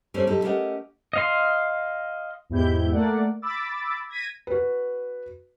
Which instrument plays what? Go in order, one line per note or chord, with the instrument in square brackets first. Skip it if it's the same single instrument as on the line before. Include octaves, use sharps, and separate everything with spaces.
[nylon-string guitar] G3 A3 C#4 D#4 C5 D5
B2 D3 F#3 D#4 G4 A4
A3 C#4 G4 A#4 D#5 F#5
[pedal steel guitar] D#5 F5 C6
[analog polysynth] E2 G#2 E4 G4 G6
A3 A#3 D5 F#5
B5 D6 E6 A6
G#6 A#6 B6 D#7
[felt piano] F#4 B4